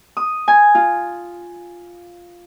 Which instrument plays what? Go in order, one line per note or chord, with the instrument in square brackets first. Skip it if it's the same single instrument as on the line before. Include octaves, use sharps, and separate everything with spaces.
[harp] D#6
G#5
F4